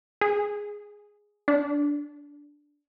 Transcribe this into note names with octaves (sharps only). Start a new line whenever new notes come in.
G#4
D4